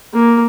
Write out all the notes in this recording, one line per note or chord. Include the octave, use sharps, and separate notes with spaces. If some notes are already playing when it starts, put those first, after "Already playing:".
A#3